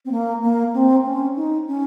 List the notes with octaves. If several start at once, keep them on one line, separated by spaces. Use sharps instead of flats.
C4
A#3
A#3
C4
C#4
D#4
C#4